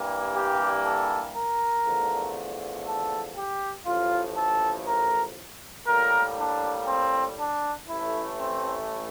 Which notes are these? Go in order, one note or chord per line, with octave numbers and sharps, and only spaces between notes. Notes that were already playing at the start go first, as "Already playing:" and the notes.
Already playing: G2 E3 G3 A#3
G4
A4
A#4
E2 D3 F3 A3
A4
G4
A1 A2 F3 F4
A4
A#4
A2 G3 A#3 A#4
D4
C4
D4
A1 A2 E3 A3 E4
C4